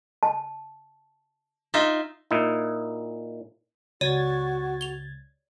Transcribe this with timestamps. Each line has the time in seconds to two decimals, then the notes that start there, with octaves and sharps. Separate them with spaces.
0.23 A5
1.74 D#4 F4 E5
2.31 A#2 D#4 E4
4.01 C#2 F#4 C#5 D5 G#6 A6 D#7
4.81 F7 G7